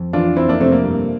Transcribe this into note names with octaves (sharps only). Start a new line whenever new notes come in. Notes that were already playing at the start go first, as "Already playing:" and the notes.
Already playing: F2
E3 D4 F4
F2 C4 E4
A#3 D4
C3 A3 C4
A#3
G2